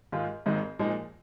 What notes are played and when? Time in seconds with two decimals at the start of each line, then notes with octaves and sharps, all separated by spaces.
0.12 G#2 D#3 G#3 F4
0.46 G#1 G#2 D#3 G#3 D#4
0.79 A#2 F3 G#3 D#4